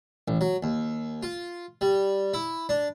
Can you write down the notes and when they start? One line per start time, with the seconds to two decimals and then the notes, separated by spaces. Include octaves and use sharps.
0.28 A1
0.41 F#3
0.63 D#2
1.23 F4
1.81 G3
2.34 E4
2.69 D4